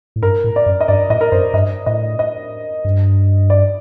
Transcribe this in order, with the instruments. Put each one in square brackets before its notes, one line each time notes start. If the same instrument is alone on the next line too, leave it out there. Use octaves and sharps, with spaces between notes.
[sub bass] A2
[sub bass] G2 [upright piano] A#4
[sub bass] A2
[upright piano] D5
[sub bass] F#2
[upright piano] D#5
[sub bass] G2 [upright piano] D5
[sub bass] A2 [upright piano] D#5
[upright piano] A#4
[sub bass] F#2 [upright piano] C5
[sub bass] G2 [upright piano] D#5
[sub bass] A2 [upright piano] D#5
[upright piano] D#5
[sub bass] G2
[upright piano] D5